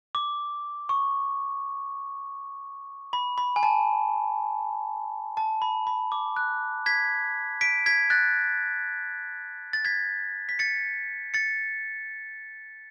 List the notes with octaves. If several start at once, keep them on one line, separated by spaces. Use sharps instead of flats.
D6
C#6
B5
B5
G#5
A5
A5
B5
B5
D6
F#6
G#6 B6
B6 D7
G#6 B6
F#6 A6
A6
G#6 B6
B6
A6 C#7
A6 C#7